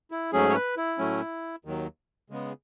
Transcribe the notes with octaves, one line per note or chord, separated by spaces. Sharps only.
E4
G#2 F#3 A3 C#4 G#4
C#5
B4
E4
A2 F#3 A3 C#4
D#2 D#3 F#3
C#3 G#3 B3